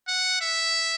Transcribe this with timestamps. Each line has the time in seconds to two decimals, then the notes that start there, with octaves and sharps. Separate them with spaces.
0.08 F#5
0.41 E5